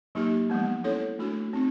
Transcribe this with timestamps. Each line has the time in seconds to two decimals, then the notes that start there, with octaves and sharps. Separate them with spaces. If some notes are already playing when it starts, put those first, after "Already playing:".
0.15 F#3 A#3 D#4 G4
0.50 F3 G#3 B3
0.84 C#4 E4 A4 C#5
1.19 A3 D4 F#4
1.53 C4 D#4